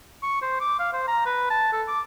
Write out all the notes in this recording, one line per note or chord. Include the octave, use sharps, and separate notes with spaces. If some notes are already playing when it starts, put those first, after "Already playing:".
C#6
C5
D6
F5
C5
A#5
B4
A5
A4
D6